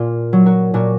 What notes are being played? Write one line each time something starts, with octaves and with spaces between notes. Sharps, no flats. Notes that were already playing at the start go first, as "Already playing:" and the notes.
Already playing: A#2 F4
F#3
F#4 A#4
A#2 F#4 A#4